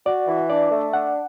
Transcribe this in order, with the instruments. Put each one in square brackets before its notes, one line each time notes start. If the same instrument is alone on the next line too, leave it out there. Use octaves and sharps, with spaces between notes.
[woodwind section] F#4 [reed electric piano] D5
[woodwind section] E3
[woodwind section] D4 [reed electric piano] D5
[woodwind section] A3
[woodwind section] D4 [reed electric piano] F#5